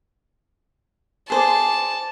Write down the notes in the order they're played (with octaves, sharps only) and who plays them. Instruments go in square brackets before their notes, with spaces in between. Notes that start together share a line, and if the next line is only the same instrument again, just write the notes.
[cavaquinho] G#4 C5 D5 [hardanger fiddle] A5